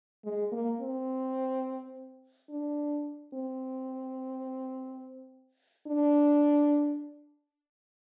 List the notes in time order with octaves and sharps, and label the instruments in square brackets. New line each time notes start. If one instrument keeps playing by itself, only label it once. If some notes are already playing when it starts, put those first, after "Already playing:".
[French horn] G#3
A#3
C4
D4
C4
D4